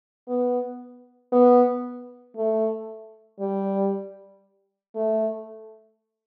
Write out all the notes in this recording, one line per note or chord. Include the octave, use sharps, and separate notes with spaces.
B3
B3
A3
G3
A3